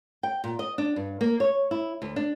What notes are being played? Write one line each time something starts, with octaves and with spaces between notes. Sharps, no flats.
G5
A#2
D#5
D4
G2
A#3
C#5
E4
D2
D4